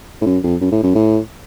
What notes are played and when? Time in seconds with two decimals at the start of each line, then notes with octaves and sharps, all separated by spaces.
0.21 A2
0.26 F#2
0.44 F2
0.61 F#2
0.72 A2
0.84 F#2
0.95 A2